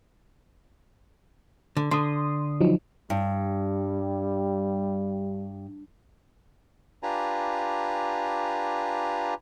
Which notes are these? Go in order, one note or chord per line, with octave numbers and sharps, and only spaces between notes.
D3
D3 C6 D#6
F3 F#3 D#4
G2 G3
D4 F4 G4 B4 G#5 A#5